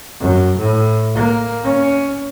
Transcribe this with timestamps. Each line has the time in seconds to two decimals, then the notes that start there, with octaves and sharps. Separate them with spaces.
0.21 F#2
0.58 A2
1.15 A#3
1.64 C#4